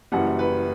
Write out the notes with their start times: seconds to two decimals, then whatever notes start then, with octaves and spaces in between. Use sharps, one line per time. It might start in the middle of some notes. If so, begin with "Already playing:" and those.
0.12 F#1 F#2 E3 G3 F#5
0.39 B4